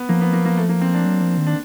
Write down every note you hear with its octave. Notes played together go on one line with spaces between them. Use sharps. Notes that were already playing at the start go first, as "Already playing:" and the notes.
Already playing: B3
F3 A#3
B3
A#3
A#3
A3
A#3
C4
D4
F#3
F3
D#3
D4